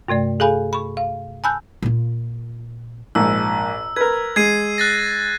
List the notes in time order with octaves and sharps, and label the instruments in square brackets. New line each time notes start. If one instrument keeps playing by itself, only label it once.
[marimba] G2 C3 A3 D5
G#4 A4 F5 G#5 B5
B5 C#6
F5
G#5 A5 B5 E6 F#6 G6
[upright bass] A#2 F4
[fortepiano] A#1 G#2 [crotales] E6
[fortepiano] A#4 B4 [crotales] G#6
[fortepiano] G#3 [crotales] G#6 C7 D#7
[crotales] F#6 A6 A#6